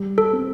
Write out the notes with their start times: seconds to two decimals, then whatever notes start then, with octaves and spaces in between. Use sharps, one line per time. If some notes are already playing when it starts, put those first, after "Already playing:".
Already playing: G3
0.18 A4
0.33 C4